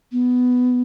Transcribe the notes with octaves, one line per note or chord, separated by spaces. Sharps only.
B3